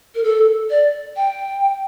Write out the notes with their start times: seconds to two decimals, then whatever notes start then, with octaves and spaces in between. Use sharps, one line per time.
0.15 A#4
0.24 A4
0.70 D5
1.16 G5